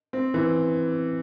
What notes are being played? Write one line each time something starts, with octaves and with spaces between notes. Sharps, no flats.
C4
E3